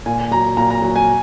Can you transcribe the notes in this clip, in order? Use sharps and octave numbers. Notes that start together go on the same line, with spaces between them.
A#2 G#5
F#3 A#5
A#2 A#5
A#5
F#3
G#5